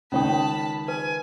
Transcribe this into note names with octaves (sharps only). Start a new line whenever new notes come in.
C#2 D#3 C#4 C#5 G5 A5 B5 D#6
B4 G#5